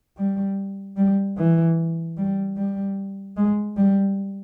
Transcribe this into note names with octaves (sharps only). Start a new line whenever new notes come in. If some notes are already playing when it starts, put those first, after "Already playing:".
G3
G3
E3
G3
G3
G#3
G3